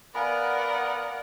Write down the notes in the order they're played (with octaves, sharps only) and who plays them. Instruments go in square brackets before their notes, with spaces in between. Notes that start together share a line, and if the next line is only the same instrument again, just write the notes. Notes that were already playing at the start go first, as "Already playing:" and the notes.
[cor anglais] B3 [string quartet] A#4 D5 F#5 [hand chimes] F5 G#5 B5